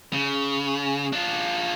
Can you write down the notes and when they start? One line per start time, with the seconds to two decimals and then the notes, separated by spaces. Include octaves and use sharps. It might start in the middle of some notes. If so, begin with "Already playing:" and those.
0.13 C#3
1.13 D4 F4